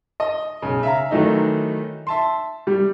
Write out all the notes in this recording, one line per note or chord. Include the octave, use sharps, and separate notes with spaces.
D#5
B1 C#3
E5 F5 A#5
D#3 E3 F#3 A3 D#4
E5 A5 C6
G3